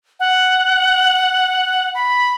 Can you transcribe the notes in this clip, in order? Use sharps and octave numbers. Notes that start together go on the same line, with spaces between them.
F#5
B5